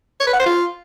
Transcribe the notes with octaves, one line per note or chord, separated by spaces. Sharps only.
C#5
B4
F#5
C5
F4